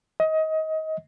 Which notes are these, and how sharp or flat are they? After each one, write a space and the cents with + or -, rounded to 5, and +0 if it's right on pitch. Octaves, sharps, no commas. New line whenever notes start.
D#5 +25